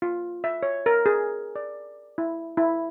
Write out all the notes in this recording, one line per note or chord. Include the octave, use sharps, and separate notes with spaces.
F4
E5
C#5
A#4
G#4
D5
E4
E4